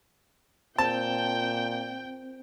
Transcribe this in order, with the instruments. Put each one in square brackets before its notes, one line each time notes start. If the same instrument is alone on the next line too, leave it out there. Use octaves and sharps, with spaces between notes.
[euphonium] A#2 [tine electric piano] C4 [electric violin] G5 G6 [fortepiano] A5